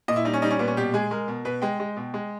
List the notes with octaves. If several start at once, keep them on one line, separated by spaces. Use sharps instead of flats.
A#2 D#5
E4
G3 D#4
C#4
G3 D#4
C#4
A#2 B3
C#4
B2 G4
G#3 G#4
G#3 A#4
B2
B2 B4
G#3 G5
G#3
B2
G#3